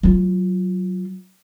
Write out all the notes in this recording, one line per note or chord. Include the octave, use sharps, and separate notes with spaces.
F#3 F4